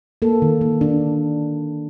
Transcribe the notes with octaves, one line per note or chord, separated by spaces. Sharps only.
A#3 A4
D#3
A#3
D#3 D4